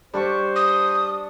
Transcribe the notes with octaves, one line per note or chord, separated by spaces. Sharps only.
G3 D4 C5 D5 C#6
D#6